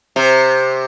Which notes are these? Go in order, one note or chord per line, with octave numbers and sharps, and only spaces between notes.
C3